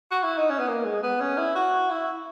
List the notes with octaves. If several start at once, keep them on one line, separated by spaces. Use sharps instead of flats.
F#4
E4
D#4
C#4
B3
A#3
G#3
B3
C#4
E4
F#4
E4